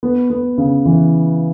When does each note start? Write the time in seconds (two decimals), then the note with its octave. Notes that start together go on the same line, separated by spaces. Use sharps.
0.03 B3
0.30 B3
0.58 C#3
0.85 E3